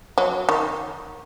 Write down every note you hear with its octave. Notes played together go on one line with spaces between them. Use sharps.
F#3
D#3